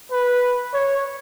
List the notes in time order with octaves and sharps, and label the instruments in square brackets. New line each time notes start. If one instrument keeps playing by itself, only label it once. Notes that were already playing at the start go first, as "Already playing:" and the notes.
[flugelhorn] B4
C#5